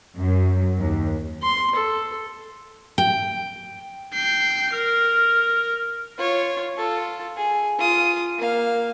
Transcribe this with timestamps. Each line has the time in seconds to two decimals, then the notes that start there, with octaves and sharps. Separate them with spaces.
0.17 F#2
0.79 D#2
1.42 C6
1.76 A4
2.98 G5
4.13 G5 C7
4.73 A#4 F6
6.18 F4 C#5
6.77 F4 A4
7.36 G#4
7.78 F4 D#6
8.38 A#3 F5